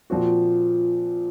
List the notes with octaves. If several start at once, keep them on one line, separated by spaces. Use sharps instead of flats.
A#2 F3 C4 F#4